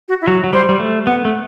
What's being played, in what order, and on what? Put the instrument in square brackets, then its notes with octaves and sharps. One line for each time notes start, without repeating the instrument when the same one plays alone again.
[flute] F#4
E4
[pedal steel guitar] F#3 [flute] F#4
[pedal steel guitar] F#3
[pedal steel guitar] G3 [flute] C5
[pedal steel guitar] G3
A3
[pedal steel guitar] B3 [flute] F#5
[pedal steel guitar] A3